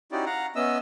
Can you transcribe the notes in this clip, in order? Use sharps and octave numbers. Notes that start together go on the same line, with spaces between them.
C#4 D#4 E4 F#4 G4 D5
F5 F#5 A#5
B3 C#4 D#5 E5 E6